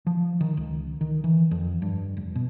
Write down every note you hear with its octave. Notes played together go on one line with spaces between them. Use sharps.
F3
D#3
C#2
D#3
E3
F2
G2
F1
B2